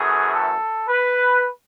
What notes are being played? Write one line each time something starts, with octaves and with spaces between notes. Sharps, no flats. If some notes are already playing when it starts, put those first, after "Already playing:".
Already playing: F#2 E3 A3 G#4
A4
B4